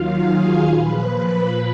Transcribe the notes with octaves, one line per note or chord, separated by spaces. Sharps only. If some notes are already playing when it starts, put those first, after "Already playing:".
Already playing: D#2 D#3 F#3 F4 F5
G#4 G#5
A#2 F3 B4 B5
B4 B5